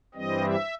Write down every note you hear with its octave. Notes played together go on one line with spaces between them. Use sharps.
G2 E3 G3 C4 D#5
E5